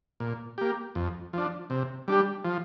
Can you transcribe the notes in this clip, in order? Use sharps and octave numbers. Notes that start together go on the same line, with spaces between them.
A#2
A#3 G4
F2
F3 D4
C3
G3 D4 G4
F3